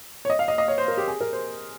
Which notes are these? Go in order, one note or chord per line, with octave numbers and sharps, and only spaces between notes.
C#5
D#5
F5
D#5
D#5
C#5
C5
A#4
G4
G#4
A#4
C5